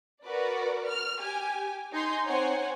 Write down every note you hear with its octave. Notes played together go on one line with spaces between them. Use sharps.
F#4 A#4 B4 D5
F6
G4 G#5
D#4 G#5 C6 G6
C4 C5 C#5 F#5 G#5